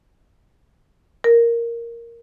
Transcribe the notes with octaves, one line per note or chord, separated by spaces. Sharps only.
A#4